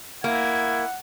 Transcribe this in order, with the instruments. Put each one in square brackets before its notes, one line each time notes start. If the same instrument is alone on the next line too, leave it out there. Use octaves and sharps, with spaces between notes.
[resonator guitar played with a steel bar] A#3 [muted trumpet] E4 [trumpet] F#5 [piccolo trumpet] G#6